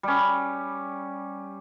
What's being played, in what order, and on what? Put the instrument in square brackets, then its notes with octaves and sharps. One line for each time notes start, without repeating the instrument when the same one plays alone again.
[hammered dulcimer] G3 C#4